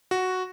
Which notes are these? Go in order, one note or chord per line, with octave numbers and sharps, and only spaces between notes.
F#4